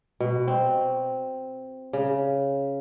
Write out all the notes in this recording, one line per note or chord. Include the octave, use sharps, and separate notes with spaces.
B2
C4
C#3